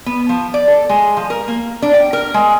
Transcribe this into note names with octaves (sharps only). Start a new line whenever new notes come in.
B3
F3
D5
A4
G#3
F3
A#4
A#3
D4
G5
A#4
G#3